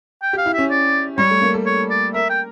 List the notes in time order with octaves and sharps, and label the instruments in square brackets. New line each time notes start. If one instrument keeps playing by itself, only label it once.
[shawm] G5
[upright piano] G4
[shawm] F5
[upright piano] E4
[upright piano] C#4 [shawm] E5
[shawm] D5
[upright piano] G3 [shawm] C#5
[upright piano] A3
A#3
A4
[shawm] C#5
D5
[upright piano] A#4 [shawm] E5
[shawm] G5